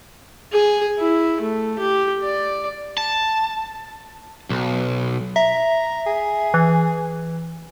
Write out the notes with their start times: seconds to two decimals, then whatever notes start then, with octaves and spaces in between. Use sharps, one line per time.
0.52 G#4
0.99 E4
1.41 A3
1.79 G4
2.22 D5
2.98 A5
4.50 B1
5.36 E5 A#5
6.07 G#4
6.54 E3